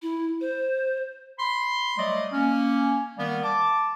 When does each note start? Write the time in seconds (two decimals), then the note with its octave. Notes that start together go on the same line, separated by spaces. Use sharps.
0.02 E4
0.41 C5
1.39 B5 C6
1.97 F#3 G3 A3 D5 D#5
2.32 A#3 C#4
3.17 D#3 G3 A#3 B3
3.43 A5 D6